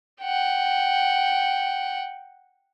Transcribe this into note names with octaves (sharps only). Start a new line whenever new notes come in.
F#5 G5